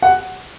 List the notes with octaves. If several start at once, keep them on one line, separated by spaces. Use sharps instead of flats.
F#5